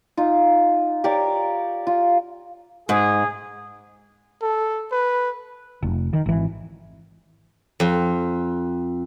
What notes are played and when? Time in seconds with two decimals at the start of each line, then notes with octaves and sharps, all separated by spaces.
0.17 D#4 F4
1.04 G4 A#4 C#5 D5
1.87 F4
2.89 G#2 G#4
4.42 A4
4.92 B4
5.83 F1
6.13 D#3
6.26 G#1 E3
7.80 F2